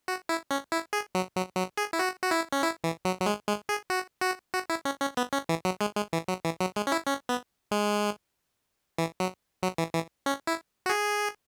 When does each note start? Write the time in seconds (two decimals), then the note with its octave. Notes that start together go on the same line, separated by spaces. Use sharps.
0.08 F#4
0.29 E4
0.51 C#4
0.72 E4
0.93 G#4
1.15 F#3
1.36 F#3
1.57 F#3
1.77 G#4
1.93 E4
1.99 F#4
2.23 F#4
2.31 E4
2.52 C#4
2.63 E4
2.84 E3
3.05 F#3
3.20 F#3
3.26 G#3
3.47 G#3
3.69 G#4
3.90 F#4
4.21 F#4
4.54 F#4
4.70 E4
4.85 C#4
5.01 C#4
5.17 B3
5.33 C#4
5.49 E3
5.65 F#3
5.81 G#3
5.96 G#3
6.13 E3
6.28 F#3
6.45 E3
6.61 F#3
6.76 G#3
6.87 C#4
6.92 E4
7.07 C#4
7.29 B3
7.71 G#3
8.98 E3
9.20 F#3
9.63 F#3
9.78 E3
9.94 E3
10.26 C#4
10.47 E4
10.86 F#4
10.90 G#4